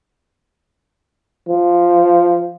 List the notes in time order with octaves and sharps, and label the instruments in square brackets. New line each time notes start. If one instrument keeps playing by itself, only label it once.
[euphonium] F3